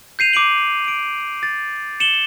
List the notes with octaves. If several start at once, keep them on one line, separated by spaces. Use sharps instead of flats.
G6 C7 D#7 F7
D6 C7 D7 F#7
D7
A6
C#7 E7 F#7 G7